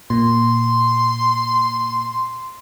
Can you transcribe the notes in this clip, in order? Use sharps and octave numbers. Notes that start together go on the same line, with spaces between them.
A#2 C6